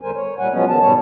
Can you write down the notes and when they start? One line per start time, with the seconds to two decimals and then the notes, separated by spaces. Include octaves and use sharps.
0.01 E2 D3 G3 A#4 C5 G#5
0.16 C#5
0.39 A#2 G3 F#5 G#5
0.51 F3 F#3 G#3 B3 C#4
0.69 D#3 B3 A5
0.80 G#2 B2 G3 C#5 A5